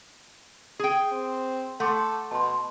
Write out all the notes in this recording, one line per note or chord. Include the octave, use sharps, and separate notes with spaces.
G#4 G5
C4
A3 A4 F#5 C6 D6
B2 A5 C6